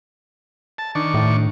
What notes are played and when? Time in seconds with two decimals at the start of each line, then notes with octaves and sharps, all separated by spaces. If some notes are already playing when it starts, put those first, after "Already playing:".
0.78 A5
0.95 D#3 D4 C#6
1.14 A2